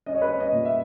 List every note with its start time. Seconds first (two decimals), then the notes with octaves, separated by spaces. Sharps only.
0.06 C#4 D#5
0.15 C#5
0.22 B4
0.28 C#4 C#5
0.40 D#5
0.52 A#2
0.65 E5